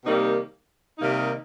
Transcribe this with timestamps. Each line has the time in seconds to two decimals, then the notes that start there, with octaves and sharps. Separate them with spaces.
0.04 C3 D#3 G3 A#3 D#4
0.98 C3 D#3 G3 A#3 D#4